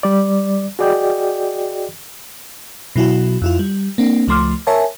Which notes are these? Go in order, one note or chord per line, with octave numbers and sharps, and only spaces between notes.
G3 D5
F#4 G#4 D5 D#5 G5
B2 F#3 E4 F#4
F2 E4 F4
G3
A#3 C4 D4
C#2 F3 A3 C6 D6 F6
A#4 C#5 E5 G#5 A5